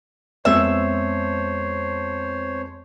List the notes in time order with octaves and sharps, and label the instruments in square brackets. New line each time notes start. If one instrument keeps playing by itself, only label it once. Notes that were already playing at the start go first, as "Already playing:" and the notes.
[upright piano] F2 G#3 B3 [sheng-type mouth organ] C5 C#5 [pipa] E5